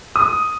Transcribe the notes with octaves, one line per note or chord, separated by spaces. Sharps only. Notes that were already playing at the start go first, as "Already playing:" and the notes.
D#6